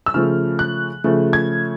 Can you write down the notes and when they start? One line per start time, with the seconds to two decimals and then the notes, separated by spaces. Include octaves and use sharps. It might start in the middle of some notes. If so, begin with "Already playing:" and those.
0.06 E6
0.14 C#3 F3 A3 F6
0.59 F#6
1.04 C#3 F3 A3
1.33 G#6